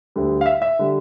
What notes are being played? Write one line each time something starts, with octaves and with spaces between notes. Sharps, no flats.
D2 D3 G3
F5
E5
E5
D3 G3